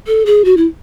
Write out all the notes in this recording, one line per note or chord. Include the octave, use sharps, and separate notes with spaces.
A4
G#4
F#4
E4